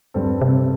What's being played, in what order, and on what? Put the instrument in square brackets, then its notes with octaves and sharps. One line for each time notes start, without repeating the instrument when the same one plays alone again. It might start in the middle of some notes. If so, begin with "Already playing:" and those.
[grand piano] G2 G3 C4 A4
[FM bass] C3